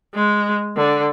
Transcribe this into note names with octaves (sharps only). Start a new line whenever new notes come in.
G#3
D3